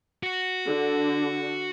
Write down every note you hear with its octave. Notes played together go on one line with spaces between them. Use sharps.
F#4
D3